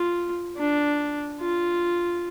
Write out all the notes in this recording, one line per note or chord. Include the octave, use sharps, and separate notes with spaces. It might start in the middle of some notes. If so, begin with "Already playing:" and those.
Already playing: F4
D4
F4